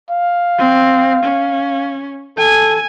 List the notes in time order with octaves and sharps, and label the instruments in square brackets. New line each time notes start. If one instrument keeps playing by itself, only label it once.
[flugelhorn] F5
[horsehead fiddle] C4
C#4
[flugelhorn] A4 [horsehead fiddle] G#5